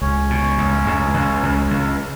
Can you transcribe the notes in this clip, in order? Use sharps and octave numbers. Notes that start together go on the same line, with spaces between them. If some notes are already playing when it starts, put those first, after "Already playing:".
C#2 C#4 C#5
B2
C#2
C#2
C#2
C#2
C#2